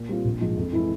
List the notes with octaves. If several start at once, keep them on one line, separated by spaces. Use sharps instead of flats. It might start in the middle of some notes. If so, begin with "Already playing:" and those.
Already playing: A#2
G3 C4 F4
A#1
G#2 F3 G#3
F2
E3 G#3 E4